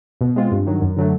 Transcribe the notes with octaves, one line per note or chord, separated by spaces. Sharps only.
B2
G#3 C4 F4
G2
D#3 F#3
F#2
D3 F#3 A3